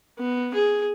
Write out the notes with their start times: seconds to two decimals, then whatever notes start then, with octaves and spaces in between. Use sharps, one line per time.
0.19 B3
0.54 G#4